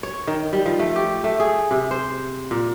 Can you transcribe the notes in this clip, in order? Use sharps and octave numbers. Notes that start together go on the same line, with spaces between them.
C#5
D#3
G3
F3
A3
G4
A3
G#4
C3
C5
A#2